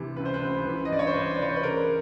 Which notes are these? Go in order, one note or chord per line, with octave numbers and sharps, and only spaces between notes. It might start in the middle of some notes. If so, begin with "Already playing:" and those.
Already playing: D2 C3 E3
C#2 B4
C5
B4
C#2
E3
D#5
G2 D5
C#5
C5
G2 B4
D5
E3 C#5
C5
B4
C#3 A#4